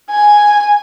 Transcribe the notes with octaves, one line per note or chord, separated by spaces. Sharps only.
G#5